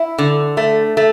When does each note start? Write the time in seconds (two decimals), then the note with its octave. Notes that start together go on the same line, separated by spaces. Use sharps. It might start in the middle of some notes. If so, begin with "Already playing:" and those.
Already playing: E4
0.18 D3
0.57 A3
0.97 A3